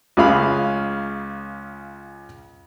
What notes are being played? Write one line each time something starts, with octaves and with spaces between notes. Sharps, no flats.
C#2 C#3 G#4 F5 B5